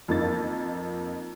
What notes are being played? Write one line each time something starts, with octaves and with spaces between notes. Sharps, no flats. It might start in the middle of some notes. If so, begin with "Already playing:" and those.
F2 A#3 D#4 A6